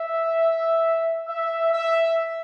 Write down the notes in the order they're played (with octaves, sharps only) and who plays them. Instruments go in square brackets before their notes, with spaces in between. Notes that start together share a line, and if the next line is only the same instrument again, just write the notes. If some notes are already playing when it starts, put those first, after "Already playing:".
Already playing: [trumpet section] E5
E5
E5